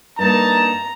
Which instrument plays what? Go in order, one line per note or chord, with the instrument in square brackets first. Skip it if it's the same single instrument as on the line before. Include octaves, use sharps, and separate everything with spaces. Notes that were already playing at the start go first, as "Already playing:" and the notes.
[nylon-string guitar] G2 A#3 [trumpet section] D#4 A5 [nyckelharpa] A#5